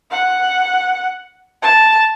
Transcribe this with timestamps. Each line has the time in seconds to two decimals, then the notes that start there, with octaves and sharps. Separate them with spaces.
0.11 F#5
1.62 A5